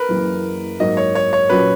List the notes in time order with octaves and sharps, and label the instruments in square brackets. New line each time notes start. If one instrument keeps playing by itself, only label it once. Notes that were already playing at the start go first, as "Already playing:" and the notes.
Already playing: [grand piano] A#4 B4
[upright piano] F#1 F#2 E3 A#3
[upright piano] G#2 F#3 A#3 [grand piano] D#5
[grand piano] C#5
C#5
C#5
[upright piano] A#2 F#3 C#4 [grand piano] B4